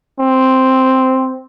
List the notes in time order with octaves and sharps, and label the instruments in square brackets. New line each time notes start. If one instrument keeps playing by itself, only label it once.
[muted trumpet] C4